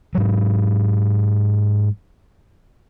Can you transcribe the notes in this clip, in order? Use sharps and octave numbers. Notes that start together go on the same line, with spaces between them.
G#2 F#3